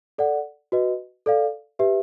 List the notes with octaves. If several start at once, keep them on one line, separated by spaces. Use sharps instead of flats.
A4 D5 F#5
F#4 B4 D#5
A4 D5 F5
G4 B4 E5